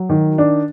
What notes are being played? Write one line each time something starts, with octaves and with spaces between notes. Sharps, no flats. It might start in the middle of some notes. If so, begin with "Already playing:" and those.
Already playing: F#3
D#3
D4